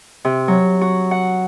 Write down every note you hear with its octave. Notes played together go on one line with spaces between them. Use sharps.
C3
F#3
F#4
F#5